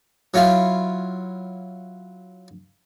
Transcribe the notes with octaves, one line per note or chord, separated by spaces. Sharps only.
F#3 C#4 E4 F4